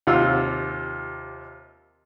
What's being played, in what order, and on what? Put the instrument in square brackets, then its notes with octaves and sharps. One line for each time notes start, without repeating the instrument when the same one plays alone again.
[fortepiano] D#2 C3 F4 F#5 E6